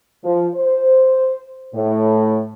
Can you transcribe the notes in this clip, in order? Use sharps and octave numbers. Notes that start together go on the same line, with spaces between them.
F3
C5
A2